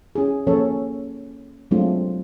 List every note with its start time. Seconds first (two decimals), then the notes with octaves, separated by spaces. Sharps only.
0.15 C#4 E4 G#4
0.47 F3 A#3 C#4 E4 A4 C#5
1.71 F#3 G#3 A3 C4 D4 F4